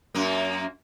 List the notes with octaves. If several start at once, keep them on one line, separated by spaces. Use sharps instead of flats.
F#2 A#3